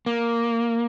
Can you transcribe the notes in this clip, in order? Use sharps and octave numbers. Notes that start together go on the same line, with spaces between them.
A#3